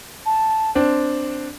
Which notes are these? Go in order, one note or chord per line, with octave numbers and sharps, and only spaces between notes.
A5
C4 D4